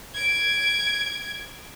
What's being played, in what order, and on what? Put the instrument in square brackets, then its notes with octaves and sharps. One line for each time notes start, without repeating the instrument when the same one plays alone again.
[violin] G#6 D7